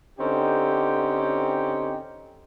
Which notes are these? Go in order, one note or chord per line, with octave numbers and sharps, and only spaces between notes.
D3 C4 C#4 D#4 G4